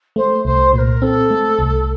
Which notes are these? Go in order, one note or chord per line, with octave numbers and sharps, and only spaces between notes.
A3 C5
C2 C5
A#2 A#4 C5
C4 A4
A3
C2